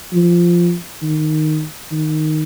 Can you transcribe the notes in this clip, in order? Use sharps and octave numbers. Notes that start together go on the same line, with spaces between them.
F3
D#3
D#3